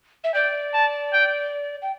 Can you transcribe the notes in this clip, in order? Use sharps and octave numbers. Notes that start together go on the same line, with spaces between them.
E5
D5 G5
A5
G5
G5